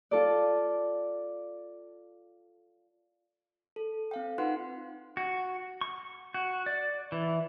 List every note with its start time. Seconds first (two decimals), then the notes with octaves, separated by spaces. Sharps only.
0.11 F4 A4 D5
3.76 A4
4.11 C4 F5 G5
4.38 D#4 F4 B4 F#5 C6 F#6
5.17 F#4
5.81 C#6
6.34 F#4
6.66 D5
7.12 E3